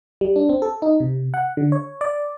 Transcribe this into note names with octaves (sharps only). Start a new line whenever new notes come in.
G3
D4
C4
A4
D#4
C3
F#5
D3
C#5
D5